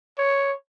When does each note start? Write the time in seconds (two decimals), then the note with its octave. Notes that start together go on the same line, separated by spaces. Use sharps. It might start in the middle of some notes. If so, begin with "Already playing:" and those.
0.18 C#5